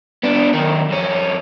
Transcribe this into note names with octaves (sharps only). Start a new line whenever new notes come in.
B3 D4
F#2 D#3
F2 C#4